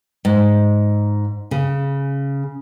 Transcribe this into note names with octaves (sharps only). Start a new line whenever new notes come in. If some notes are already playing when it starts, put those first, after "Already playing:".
G#2
C#3